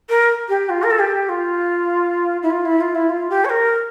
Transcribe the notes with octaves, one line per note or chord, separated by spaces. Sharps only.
A#4
G4
F4
A#4
A4
G4
F4
E4
F4
E4
F4
E4
F4
G4
C#5
A#4